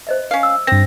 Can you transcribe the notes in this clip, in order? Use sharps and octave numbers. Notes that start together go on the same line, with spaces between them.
C5 D#5 E5
C#4 F5
E6
G2 C4 A#6